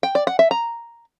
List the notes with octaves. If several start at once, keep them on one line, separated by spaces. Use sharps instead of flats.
G5
D5
F#5
E5
A#5